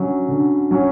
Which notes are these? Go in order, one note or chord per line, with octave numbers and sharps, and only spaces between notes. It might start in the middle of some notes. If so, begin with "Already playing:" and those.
Already playing: D3 F#3 C#4
D3
F#3 C#4